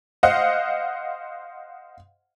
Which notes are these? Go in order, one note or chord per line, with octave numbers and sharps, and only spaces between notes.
C5 D#5 F5 F#5